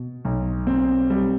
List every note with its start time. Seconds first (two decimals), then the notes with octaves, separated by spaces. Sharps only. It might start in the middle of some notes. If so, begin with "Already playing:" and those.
Already playing: B2
0.25 B1
0.67 C4
1.10 G3